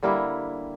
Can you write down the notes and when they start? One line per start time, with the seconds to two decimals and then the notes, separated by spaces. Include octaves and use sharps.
0.03 D3 G3 A#3 E4